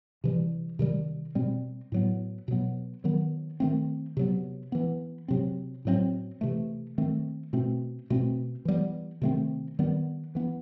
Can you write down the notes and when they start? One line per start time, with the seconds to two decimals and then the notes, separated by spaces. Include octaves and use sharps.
0.24 C3 E3 G3
0.79 C3 D#3 G3
1.35 B2 G3 C4
1.92 A2 F#3 B3
2.48 B2 F#3 B3
3.04 D#3 F#3 B3
3.60 D#3 A3 C4
4.17 C3 F#3 B3
4.72 E3 B3
5.28 C3 F#3 C4
5.85 A2 F#3 A3 C4
6.41 C3 E3 A3
6.98 D#3 A3 C4
7.53 B2 A3 C4
8.10 B2 A3 C4
8.65 E3 G3 B3
9.22 C3 D#3 A3 C4
9.79 D#3 G3 B3
10.35 E3 B3